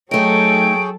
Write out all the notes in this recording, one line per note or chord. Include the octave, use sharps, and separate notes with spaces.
F#3 A3 D#4 G#4 A4 C#5 G5 D7